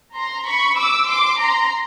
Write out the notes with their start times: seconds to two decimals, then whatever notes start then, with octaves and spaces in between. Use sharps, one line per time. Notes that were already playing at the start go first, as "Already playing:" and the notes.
0.16 A#5 C6
0.46 B5 C#6
0.77 D6 E6
1.08 C6 D6
1.39 A#5 C6